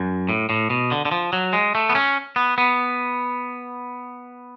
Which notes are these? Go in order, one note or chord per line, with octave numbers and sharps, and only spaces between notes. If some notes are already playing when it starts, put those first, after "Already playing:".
Already playing: F#2
A2
A2
B2
D3
D3
F3
F#3
G#3
A3
B3
C#4
B3
B3